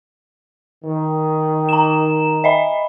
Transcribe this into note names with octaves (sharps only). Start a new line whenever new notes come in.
D#3
A#5 E7
D#5 E5 B5